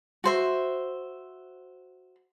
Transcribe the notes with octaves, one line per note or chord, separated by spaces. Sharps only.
F#4 C5 E5